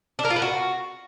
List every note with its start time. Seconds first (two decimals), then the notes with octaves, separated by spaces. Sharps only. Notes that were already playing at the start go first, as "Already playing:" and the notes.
0.19 D4
0.25 A#4
0.30 F4
0.36 B4
0.42 F#4